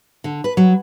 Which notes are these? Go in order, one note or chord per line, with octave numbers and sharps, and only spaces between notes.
D3
B4
F#3